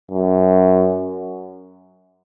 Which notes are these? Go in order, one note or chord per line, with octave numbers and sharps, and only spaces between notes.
F#2